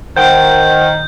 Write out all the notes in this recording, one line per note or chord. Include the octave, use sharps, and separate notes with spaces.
D#3 C5 F#5 G5 G6